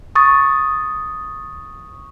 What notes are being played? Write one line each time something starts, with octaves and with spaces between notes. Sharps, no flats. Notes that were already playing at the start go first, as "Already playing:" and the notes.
C#6 D#6 A6